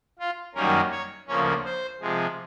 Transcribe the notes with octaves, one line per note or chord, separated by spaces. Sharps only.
F4
F#2 D#3 G3 A#3 C#4 A#4
C#5
D2 C#3 F3 A#3 C#4 C#5
C5
C3 F3 G#3